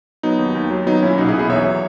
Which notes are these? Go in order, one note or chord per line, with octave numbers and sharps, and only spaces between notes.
F#3 B3 D#4
D#2
D#2
F#3
F#3 B3 D#4
A#2 C#4 E4
B1 D#4 F#4
E4 G#4
B1
E4 G#4
E2 C#5 E5
F#3